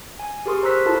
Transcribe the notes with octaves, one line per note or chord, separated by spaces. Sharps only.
G#5
G4 G#4 A#4 C6 C#6 D#6
C5 A#5 C#6 E6 F#6 B6
E4 F4 A4 A#4 A5 B5